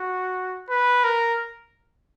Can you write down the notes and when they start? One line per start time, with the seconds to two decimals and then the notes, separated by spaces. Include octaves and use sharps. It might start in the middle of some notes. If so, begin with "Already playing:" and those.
Already playing: F#4
0.69 B4
1.04 A#4